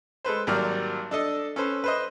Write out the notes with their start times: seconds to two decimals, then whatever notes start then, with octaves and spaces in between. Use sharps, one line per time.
0.24 G#3 A4 B4 C5
0.47 G#1 F#3 G3 A#3 D5 F6
1.11 D4 A4 D#5
1.56 C#4 A4 B4 C5
1.84 B4 C5 D#5